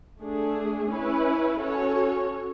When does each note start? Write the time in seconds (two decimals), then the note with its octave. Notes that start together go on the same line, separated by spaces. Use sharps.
0.21 A3 D4 G#4
0.90 C#4 E4 B4
1.59 C#4 F#4 A4 C#5